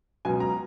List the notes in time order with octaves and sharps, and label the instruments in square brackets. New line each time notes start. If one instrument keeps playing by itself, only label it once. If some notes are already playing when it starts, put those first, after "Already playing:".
[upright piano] C#2 B2 F#3 G#5
A#5